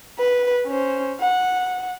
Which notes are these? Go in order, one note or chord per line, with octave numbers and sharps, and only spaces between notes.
B4
C#4 C5
F#5